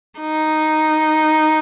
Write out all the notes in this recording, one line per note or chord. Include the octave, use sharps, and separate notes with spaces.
D#4